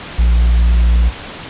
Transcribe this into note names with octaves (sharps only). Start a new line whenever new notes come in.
A#1